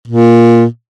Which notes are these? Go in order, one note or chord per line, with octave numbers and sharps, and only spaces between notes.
A#2